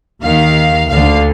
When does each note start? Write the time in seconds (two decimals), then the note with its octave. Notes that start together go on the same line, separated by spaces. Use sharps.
0.22 D#2 D#3 F5
0.88 D2 D3 F5